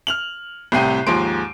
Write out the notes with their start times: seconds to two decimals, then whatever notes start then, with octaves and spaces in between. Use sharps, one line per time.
0.07 F6 F7 F#7
0.72 C2 A2 C3 G5 C7 D#7
1.07 D#2 G#2 F3 G#3 C6 D7